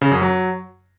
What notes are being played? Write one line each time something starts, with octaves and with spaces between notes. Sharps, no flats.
C#3
F#2
F#3